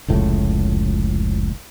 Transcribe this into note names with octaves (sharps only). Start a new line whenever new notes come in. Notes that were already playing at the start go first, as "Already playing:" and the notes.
F1 C#2 A2